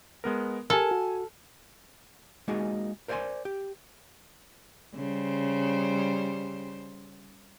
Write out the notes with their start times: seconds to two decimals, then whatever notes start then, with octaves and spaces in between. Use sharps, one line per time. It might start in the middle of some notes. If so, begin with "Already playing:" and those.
0.24 G#3 B3 A#4
0.70 G4 A4 A#4 G#5 F6
0.91 F#4
2.48 G#3 A#3 D#4 F#4 G#4
3.08 A#4 C5 D5 D#5 G#5 C6
3.45 G4
4.95 C#3 G3 C5